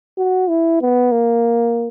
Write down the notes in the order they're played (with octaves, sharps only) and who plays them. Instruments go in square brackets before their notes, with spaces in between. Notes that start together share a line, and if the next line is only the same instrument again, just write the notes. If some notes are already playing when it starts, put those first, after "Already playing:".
[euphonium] F#4
E4
B3
A#3